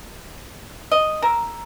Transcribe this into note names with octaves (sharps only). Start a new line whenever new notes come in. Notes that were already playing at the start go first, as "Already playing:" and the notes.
D#5
A#4 A#5 E6